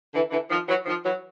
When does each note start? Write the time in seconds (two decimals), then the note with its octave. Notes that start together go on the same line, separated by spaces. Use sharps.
0.14 D3 E3
0.31 D3 E3
0.49 D#3 F3
0.67 E3 F#3
0.86 D#3 F3
1.03 E3 F#3